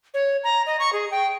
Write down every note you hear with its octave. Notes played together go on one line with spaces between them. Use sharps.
C#5
A#5
D#5
C#6
G#4
G5